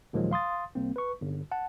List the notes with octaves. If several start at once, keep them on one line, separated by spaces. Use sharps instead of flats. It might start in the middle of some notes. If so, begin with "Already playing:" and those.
D#2 A#2 D#3 F3 F#3 G#3
F5 C6 D#6 A6
C2 A#3 C4
B4 C#6
G1
F#5 A5